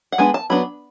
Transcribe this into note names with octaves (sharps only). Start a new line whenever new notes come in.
F#5
G#3 B3 D4 G#5
A5
F#3 B3 D4 B5